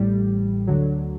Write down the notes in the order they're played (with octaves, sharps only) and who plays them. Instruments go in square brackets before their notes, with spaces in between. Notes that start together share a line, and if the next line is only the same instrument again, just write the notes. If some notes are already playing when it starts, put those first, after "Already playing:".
Already playing: [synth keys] A1 A2 G3
D2 D3 F#3